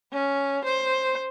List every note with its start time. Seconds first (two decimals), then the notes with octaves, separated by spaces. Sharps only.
0.13 C#4
0.65 C5